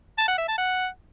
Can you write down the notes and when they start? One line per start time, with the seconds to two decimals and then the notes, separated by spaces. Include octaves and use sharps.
0.18 A5
0.28 F#5
0.38 E5
0.48 A5
0.58 F#5